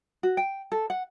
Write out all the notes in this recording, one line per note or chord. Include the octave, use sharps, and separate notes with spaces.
F#4
G5
A4
F#5